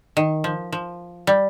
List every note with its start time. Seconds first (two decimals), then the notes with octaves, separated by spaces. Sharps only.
0.17 D#3
0.44 F3
0.72 F3
1.27 G3